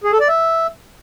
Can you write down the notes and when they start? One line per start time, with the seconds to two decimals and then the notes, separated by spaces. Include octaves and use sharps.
0.04 G#4
0.12 A4
0.20 D5
0.28 E5